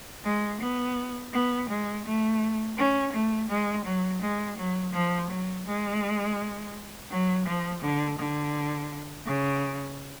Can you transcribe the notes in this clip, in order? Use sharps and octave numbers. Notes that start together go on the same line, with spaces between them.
G#3
B3
B3
G#3
A3
C#4
A3
G#3
F#3
G#3
F#3
F3
F#3
G#3
F#3
F3
D3
D3
C#3